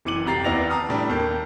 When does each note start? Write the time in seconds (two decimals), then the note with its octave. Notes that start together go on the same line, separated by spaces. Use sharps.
0.05 F#1 E3 D6 C#7 D#7 F#7
0.25 C2 F2 G4 A#5 A6 C7
0.44 D#2 B3 E4 D5 A#6 F7
0.70 A5 A#5 D#6 F6
0.89 A2 G3 D4
1.09 D#2 A#3 A5 G6